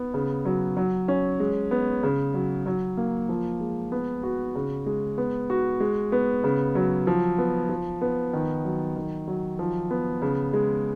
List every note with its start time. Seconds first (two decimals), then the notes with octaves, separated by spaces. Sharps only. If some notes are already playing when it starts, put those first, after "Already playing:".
Already playing: B3
0.14 C#3
0.45 F#3
0.77 F#3
1.08 C#4
1.40 G#3
1.71 B3
2.03 C#3
2.34 F#3
2.66 F#3
2.97 A#3
3.29 F3
3.61 G#3
3.92 B3
4.23 F#4
4.55 C#3
4.86 G#3
5.18 B3
5.50 F#4
5.80 G#3
6.12 B3
6.44 C#3
6.75 F#3
7.07 F3
7.38 B3
7.69 F3
8.02 B3
8.33 D#3
8.65 F#3
8.96 D#3
9.28 F#3
9.59 F3
9.91 B3
10.22 C#3
10.53 G#3